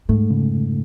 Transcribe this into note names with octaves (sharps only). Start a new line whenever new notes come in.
G#2 A3
C#3